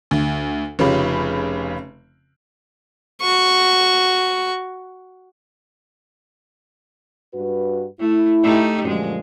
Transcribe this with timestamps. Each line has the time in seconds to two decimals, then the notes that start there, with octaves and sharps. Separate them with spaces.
0.11 D2
0.79 F1 C#3 C#4 F4 G4 B5
3.22 F#4 C#6
7.33 G2 F#4 B4
8.00 A3 E4
8.43 A3 D#4 G4
8.85 F#2 A#2 D3 F3 G#3